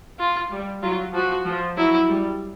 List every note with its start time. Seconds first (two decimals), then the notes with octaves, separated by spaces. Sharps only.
0.19 F4
0.51 G3
0.82 F#3 F4
1.13 F3 F#4
1.46 F3
1.77 F#3 E4
2.09 G3